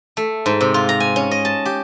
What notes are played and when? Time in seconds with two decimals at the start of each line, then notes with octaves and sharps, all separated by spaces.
0.17 A3
0.46 G#2
0.61 C3
0.74 F4
0.89 A#5
1.00 G#5
1.16 C#4
1.31 D#5
1.45 A5
1.65 G4